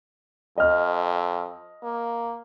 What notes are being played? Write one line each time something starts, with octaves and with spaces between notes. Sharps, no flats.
F2 D#5 F6
A#3